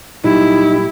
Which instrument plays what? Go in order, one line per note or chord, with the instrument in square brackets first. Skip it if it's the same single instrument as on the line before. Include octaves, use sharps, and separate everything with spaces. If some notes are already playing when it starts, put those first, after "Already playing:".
[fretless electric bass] A#2 F#3 G3 [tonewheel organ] D#4 [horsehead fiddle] E4 [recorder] G4